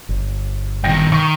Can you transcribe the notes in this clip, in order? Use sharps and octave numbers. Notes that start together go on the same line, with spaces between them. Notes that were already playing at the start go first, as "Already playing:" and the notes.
G1
G2 D#3 G5 A#6
D#3 C#6